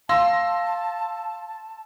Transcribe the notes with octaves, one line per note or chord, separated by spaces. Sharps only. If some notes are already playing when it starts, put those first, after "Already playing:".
F5 A5 C6 E6 A#6